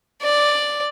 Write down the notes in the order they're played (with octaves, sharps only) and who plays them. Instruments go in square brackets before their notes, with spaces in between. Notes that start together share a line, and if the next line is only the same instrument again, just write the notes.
[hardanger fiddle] D5